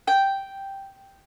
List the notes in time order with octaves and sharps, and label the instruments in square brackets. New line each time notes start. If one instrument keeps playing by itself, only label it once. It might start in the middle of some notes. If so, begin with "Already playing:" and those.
[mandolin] G5